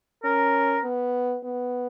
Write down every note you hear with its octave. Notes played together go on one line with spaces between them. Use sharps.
C#4 A#4
B3
B3